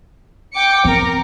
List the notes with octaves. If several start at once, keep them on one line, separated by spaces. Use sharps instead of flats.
G5 D6 C#7
C4 A#4